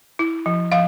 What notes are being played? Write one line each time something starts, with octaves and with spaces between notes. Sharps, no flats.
E4
F3
F3 F5